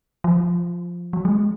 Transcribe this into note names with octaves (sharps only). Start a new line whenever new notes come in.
F3
F#3
G#3